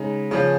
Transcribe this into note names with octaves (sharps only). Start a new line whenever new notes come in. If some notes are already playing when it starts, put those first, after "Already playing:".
Already playing: C#3 G#3 D#4
C#3 F3 C#4